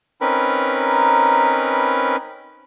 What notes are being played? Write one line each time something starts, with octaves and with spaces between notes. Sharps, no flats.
C4 C#4 D#4 A#4 B4 B5